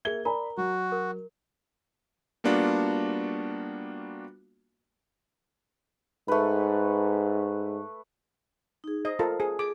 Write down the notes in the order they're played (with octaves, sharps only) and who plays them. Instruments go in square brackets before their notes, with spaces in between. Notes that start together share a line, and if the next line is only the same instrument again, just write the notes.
[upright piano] A#3 E5 G7 [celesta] G#4 G#6
[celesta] A#4 A#5 [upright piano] D5 G#5 B5
[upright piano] F#3 [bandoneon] F#4
[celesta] A#4
[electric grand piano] G3 A#3 B3 D4 F4 F#4
[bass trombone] G#2 [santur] A3 B4
[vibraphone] D#4 G#4
[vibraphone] C5 [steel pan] D#5
[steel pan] F4 A4 A#4
G#4
[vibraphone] G#4 [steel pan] D6